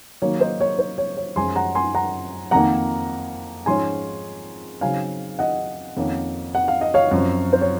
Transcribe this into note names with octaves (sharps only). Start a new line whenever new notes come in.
D#3 F#3 A#3 C#5
C5 D#5
C#5
C5
C#5
C#5
F#2 F3 G#3 C#4 G#5 C6
F#5 A#5
G#5 C6
F#5 A#5
F2 D#3 A#3 F#5 A#5
G#2 F3 G#3 C#4 G#5 C6
C#3 F#3 C4 D#4 F5 G#5
D#5 F#5
F2 D#3 A#3 C#4
F#5
F5
D#5
C#5 F5
F#2 F3 C4
C5
C#5